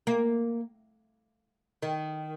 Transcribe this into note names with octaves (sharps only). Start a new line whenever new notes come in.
A#3
D#3